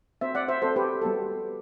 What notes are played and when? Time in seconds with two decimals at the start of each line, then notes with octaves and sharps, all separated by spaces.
0.21 C4 F#4 C5 E5
0.35 D5 F#5
0.48 C5 E5
0.62 C4 F#4 A4 C5
0.76 G4 B4
1.02 G3 B3 F#4 A4